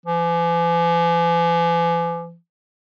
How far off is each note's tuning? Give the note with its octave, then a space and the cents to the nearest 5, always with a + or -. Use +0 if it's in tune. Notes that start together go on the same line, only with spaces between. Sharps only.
E3 +45